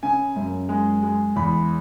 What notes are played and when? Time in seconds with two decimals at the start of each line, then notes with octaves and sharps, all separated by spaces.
0.03 C#3 G#5
0.36 F#2
0.69 G#3
1.03 G#3
1.36 E2 B5